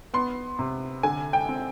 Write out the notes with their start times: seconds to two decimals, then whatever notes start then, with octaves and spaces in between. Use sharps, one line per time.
0.14 B3 C6
0.59 C3
1.03 D3 G#5
1.33 G5
1.49 C4